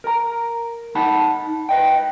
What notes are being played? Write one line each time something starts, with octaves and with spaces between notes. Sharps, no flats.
A#4 A#5
D#4 F#5 A5 B5
B4 D#5 G5